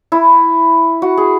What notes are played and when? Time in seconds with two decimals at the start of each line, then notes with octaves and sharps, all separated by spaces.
0.12 E4
1.02 F#4
1.17 G#4